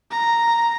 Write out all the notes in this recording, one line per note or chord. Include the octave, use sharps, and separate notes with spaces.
A#5